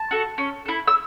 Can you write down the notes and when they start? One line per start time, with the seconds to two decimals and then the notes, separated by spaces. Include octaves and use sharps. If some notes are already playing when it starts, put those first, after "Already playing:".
Already playing: A5
0.11 F#4 A4
0.38 C#4
0.66 E4 A4
0.88 E6